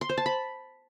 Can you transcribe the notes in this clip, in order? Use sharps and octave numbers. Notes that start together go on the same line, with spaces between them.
C6
C5
A5
B5